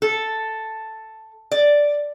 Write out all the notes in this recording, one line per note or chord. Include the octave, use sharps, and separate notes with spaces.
A4
D5